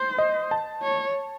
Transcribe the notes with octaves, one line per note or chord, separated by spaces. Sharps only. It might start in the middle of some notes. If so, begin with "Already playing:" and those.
Already playing: C5
D#5
A5
C#5